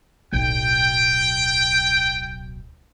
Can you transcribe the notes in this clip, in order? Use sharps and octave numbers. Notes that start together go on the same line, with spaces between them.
D1 B1 G5